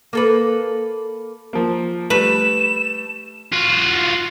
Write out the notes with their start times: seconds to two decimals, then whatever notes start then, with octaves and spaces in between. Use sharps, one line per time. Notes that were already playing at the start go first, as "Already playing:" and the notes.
0.13 A#3 A4 B4
1.53 F3 A#3
2.10 G3 A3 B4 E7
3.53 F4 F#4